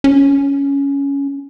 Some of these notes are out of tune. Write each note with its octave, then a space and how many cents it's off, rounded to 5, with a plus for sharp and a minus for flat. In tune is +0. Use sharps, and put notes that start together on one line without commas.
C#4 +10